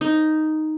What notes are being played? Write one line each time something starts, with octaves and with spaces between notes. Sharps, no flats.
D#4